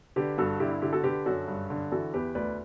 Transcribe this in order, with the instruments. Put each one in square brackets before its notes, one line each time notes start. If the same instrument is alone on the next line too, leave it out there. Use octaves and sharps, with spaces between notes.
[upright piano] D3 G4 B4
G2 F#4 A4
D3 E4 G4
E4
D3 E4 G4
F#4 A4
D3 G4 B4
F#2 F#4 A4
G2
D3
E3 F#4 A4
E2 G4 B4
D2 B4 D5